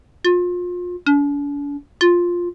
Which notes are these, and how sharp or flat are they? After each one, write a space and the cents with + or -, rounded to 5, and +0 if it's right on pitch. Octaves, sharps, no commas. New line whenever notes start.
F4 +30
D4 -45
F4 +5